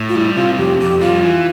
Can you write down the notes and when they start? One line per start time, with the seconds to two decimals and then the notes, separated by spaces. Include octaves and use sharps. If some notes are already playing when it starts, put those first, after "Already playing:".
Already playing: A2
0.09 F4
0.15 G3 E4
0.36 C3 F4
0.58 F2 G4
0.79 F2 G4
1.01 G3 F4
1.23 E3